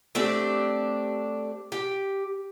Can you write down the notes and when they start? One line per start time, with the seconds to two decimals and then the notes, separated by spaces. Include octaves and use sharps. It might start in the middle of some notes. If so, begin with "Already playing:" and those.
0.15 A3 C4 D4 G4
1.72 G4